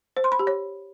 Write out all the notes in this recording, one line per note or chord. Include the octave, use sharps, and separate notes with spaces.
C5
C6
B5
G4
C#5